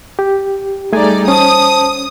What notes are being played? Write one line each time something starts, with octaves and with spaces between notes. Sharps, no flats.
G4
G3 A3 D#4 G#4 D5 G#5
C#4 C5 A5 D#6